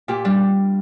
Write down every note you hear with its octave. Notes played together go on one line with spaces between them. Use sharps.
A#2 G4
G3 D4